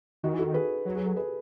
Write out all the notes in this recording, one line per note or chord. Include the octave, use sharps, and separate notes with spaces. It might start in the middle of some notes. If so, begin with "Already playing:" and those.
D#3 D#4 F#4
E3
F#4 A4
D#3
G#4 B4
F#3
G#4
A4
G#4 B4